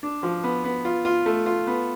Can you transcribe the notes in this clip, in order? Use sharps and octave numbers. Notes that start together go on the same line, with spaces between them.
D4
F3
B3
B3
F4
F4
A3
F4
B3